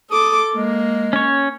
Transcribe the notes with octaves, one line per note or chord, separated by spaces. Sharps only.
A4 D6 D#6
G#3 A#3
C#4 C#5